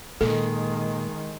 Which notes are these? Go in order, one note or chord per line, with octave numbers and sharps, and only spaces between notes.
A#2 D#3 G#3 A4